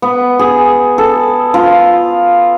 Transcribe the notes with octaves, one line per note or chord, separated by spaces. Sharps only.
B3
G#4
A4
F4